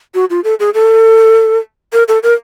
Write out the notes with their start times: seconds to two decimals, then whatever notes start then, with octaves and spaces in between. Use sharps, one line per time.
0.15 F#4
0.30 F4
0.44 A4
0.60 G#4
0.74 A4
1.93 A#4
2.08 A4
2.23 A#4